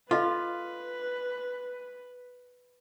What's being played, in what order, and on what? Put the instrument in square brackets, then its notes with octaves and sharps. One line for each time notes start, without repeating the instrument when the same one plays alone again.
[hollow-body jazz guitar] F4 [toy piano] A4 D#5 F5 [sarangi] B4